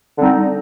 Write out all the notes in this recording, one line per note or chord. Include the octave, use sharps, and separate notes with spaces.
D3 G3 C4 D#4